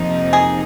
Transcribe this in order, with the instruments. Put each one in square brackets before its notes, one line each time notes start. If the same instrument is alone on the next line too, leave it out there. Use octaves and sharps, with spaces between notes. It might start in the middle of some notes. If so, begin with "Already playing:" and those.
Already playing: [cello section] F2 C3 F3 A#3 D#4
[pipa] G#4